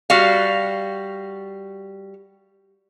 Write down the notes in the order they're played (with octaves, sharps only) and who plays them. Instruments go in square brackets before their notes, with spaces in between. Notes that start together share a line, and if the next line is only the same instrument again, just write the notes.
[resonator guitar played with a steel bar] G3 F#4 F5